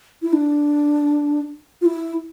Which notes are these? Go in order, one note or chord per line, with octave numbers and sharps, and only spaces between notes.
E4
D4
F4
E4